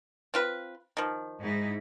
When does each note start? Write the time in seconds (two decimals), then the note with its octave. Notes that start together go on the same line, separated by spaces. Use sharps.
0.34 C4 F4 B4
0.97 D#3 F3
1.42 G#2 D#4 E4